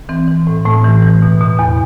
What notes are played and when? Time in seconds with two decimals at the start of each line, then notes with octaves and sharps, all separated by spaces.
0.09 E3 C4
0.28 E3
0.47 A2
0.65 A2 A3
0.84 E3
1.03 E3
1.22 B2
1.40 B2
1.59 E2